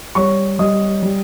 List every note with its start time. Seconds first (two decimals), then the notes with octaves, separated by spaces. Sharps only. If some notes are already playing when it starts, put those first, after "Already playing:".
0.15 G3 C#5 C#6
0.59 G3 D#5 D#6
1.03 G3